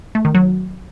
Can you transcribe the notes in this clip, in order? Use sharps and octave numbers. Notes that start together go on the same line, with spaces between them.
A3
D#3
F#3